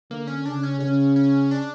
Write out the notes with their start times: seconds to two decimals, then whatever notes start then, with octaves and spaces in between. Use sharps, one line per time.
0.10 D3 A#3
0.27 C#4
0.45 C#3 D4
0.63 C#4
0.80 C#3 C#4
1.16 C#4
1.51 D4